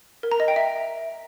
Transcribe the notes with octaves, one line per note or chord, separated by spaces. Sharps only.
A#4
A#5
D#5
G5
E5